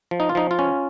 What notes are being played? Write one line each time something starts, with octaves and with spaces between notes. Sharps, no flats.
F3
D#4
F4
F3 D#4
F4
C#4